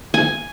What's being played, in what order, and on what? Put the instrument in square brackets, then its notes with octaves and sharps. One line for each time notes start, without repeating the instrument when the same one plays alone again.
[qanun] G#5